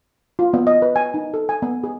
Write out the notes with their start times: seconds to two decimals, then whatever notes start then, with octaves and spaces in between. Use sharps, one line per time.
0.39 F4
0.54 B3
0.67 D#5
0.82 B4
0.96 G#5
1.14 D#4
1.34 A4
1.49 G#5
1.62 B3
1.84 G#4